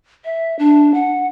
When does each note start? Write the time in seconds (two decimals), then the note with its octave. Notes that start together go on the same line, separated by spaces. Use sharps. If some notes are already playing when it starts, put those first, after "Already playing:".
0.25 E5
0.59 D4
0.94 F#5